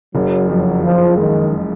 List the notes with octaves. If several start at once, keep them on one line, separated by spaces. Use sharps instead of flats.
F#1 F#3
F2 F#3
C#3 F3
D#3 G#3